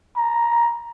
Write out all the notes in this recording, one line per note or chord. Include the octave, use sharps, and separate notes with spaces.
A#5